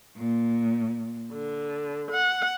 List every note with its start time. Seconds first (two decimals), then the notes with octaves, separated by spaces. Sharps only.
0.16 A#2
1.32 D3
2.11 F#5